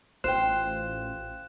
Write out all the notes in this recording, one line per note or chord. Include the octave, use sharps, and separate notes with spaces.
A1 F4 C5 G5 F#6 E7